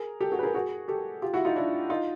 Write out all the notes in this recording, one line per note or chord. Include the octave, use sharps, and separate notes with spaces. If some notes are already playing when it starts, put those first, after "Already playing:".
Already playing: G#4 A#4
G4 A4
F#4 G#4
B4
G#4 A#4
F#4 G#4
G4 A4
F4 G4
E4 F#4
D#4 F4
D4 E4
D#4 F4